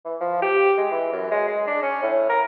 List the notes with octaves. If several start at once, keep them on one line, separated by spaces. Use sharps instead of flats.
E3
F3
G4
G#3
E3
F#2
G#3
G#3
D4
C#4
A2
A#4